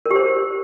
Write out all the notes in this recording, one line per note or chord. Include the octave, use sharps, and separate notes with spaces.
A#4
G4
C5